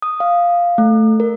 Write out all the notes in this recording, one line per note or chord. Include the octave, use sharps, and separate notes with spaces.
D#6
F5
A3
A#4